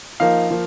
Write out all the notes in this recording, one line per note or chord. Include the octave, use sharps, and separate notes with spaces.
F3 A#3 D#4 F5
F3 A#3